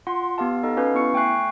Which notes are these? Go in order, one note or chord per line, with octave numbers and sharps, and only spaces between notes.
F4 F#5 C6
B3 G4 F5 A5
D#4 A4 D#5
C#4 F#4 B4 F5
B3 E4 C#6 C#7
A3 G5 G#5 C#6 F#6 C7